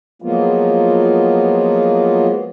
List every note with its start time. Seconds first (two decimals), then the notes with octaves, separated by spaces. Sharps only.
0.22 F3 F#3 G#3 A#3 B3 F4